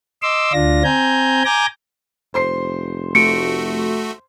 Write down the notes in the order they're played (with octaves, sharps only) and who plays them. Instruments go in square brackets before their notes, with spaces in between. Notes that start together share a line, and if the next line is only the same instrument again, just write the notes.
[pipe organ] D#5 C6 D6 E6
D2 D4 F4 A#6
C4 G#5 A#5 G6
G#5 A#5 D6 G6 A#6
[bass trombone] F1 [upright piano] C5 C6 C7
[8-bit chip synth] A3 F#4 A4 [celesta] C#7 D7